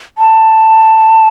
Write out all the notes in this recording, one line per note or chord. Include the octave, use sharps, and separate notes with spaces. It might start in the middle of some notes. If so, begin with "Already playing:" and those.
A5